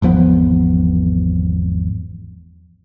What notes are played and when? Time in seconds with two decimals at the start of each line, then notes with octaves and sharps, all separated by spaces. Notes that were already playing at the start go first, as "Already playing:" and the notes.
0.02 G#1 E2 F3 B3